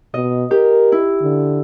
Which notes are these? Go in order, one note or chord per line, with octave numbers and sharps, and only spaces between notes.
B2 D#5
G4 A#4
E4
D3